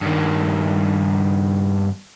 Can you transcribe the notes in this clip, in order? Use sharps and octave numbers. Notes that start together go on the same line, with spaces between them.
G2 D#3